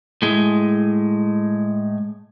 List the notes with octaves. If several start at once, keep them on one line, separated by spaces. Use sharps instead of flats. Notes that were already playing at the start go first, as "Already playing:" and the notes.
A2 G#3